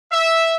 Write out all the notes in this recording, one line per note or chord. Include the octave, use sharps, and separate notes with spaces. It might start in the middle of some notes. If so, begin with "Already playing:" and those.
E5